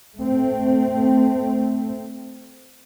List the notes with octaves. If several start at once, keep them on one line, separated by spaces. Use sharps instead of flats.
A3 C4